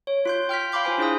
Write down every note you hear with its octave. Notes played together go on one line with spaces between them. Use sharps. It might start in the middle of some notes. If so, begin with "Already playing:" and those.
C#5
F4 C6 G6
G5 F6 G6 B6
F5 B5 C6 D6 G6
F4 C5 G#5
D4 E4 G#4 F5 D#6